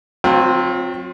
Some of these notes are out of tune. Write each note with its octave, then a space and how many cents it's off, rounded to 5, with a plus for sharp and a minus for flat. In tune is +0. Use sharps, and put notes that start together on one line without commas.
F#3 -25 C4 +0 F4 +30